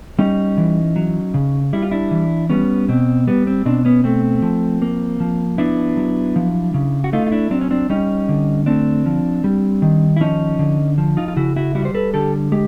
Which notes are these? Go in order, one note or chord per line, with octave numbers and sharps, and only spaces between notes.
G3 C#4 D#4
E3
F#3
C#3
G3 E4
F4
D4 E4
E3
G3 B3 C#4
B2 C4
G3 B3
C4
B2 C4 D4
B3 C#4
A3 C4
F3
A#3
F3
B3 D4 E4
F#3
F3
C#3
F#4
A3 D#4 F4
F4
D4 E4
F#3 C4 D4
C#4
C4 D4
G3 C#4 D#4
D3
A3 C4 D4
F3
G3
D#3
E4
F3 C#4 D#4
D3
F3
D#4 F4
F4
C#3 E4 F#4
E4 F#4
G3 E4 F#4
C5
A4 B4
D3 G4 A4
G#3 G4